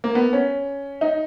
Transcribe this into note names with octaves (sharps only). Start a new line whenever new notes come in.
A#3
B3
C#4
D#4